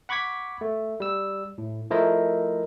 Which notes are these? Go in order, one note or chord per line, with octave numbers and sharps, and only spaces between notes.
F#5 B5 C#6 D6 G#6 B6
A3
G3 E6
A2
F3 A3 E4 A#4 C5 D#5